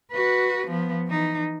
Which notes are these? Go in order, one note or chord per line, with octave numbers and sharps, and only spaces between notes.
F#4 B4
F3 B3
E3 D#4